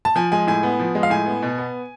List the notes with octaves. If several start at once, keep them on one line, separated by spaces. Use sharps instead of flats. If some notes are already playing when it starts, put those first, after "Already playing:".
A5
F3 G#5
G#3 G#5
A2 G#5
B3
F3
G#3
F5
A2 G#5
B3
B2
B3